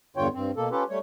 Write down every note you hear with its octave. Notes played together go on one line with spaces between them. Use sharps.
E2 G2 D3 F4 C#5 G5
G2 C4
B2 A#3 A4
C#4 F4 G4 A4 B4
G3 A3 C#5